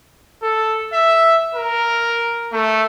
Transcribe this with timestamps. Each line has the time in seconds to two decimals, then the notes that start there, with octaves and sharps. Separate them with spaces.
0.43 A4
0.93 E5
1.55 A#4
2.53 A3